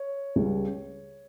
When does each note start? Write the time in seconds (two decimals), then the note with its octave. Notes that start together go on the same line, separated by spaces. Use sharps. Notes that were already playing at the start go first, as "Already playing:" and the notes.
Already playing: C#5
0.36 C#2 C#3 G3